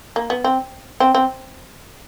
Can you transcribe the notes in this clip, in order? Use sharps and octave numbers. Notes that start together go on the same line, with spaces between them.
A#3
B3
C4
C4
C4